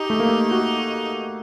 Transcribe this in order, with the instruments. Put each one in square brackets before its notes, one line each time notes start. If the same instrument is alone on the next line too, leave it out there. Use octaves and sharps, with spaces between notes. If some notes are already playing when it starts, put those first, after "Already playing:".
Already playing: [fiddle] D#4 [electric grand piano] G4
[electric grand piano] A3
A#3
F#4